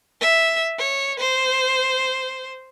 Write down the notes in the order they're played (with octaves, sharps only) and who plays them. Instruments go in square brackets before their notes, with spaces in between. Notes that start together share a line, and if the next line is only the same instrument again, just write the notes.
[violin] E5
C#5
C5